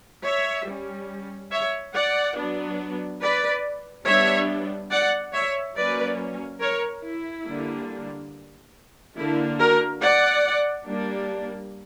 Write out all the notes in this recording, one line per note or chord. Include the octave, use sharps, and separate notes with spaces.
C#5 E5
G3 C#4
C#5 E5
D5 F#5
F#3 B3 D4
B4 D5
G3 B3 D4 C#5 E5
D5 F#5
C#5 E5
F#3 A#3 C#4 B4 D5
A#4 C#5
E4
D3 G3 A#3 D4
D3 A#3 D4 E4
F#4 A#4
D5 F#5
G3 A#3 D4